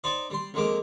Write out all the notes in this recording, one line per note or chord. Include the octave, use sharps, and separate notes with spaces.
D#4 C5 D5
G3 C6
F2 G#3 A#3 D6